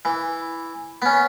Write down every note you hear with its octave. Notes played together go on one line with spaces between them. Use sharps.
E3
B3 C#4